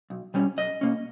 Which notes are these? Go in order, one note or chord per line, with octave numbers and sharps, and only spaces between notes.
B1
B2 G3 C#4
B1 D#5
B2 A#3 C#4